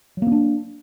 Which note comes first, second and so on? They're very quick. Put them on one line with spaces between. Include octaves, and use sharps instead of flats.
F#3 A#3 C4 D4